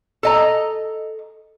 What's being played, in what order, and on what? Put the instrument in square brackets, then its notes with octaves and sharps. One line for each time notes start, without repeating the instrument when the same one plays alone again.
[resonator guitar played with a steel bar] A4 D#5 A#5